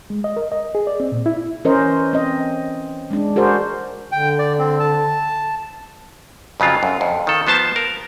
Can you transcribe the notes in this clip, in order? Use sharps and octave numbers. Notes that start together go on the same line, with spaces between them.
G#3
D#5
A#4
D#5
G#4
D5
C4
A#2
E4
E3 C#4 A#4 C5 D#5
C4 D#5
G#3 D4
F#4 G#4 A#4 C5 D5
D3 G5
D5
C4
A5
F2 C#3 F#3 F4
F#2
F2
D#3 A4
F3 B3 C5 A5
A#4